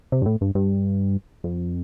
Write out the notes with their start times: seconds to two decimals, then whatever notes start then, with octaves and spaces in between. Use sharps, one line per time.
0.12 C3
0.22 G2
0.26 A2
0.41 G2
0.55 G2
1.44 F2